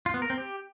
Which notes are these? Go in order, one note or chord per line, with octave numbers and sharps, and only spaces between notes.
F4
B3
A#4
C4
G4